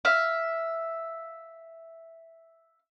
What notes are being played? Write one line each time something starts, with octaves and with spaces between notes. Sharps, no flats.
E5 F5